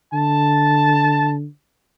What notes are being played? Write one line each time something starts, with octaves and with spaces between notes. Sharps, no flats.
D3 A5